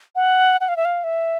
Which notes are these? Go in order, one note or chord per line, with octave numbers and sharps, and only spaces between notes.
F#5
F#5
F5
E5
F5
E5